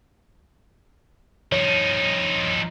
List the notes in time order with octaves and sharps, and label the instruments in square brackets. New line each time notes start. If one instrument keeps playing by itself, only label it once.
[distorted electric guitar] F3 D#4 [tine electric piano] C#5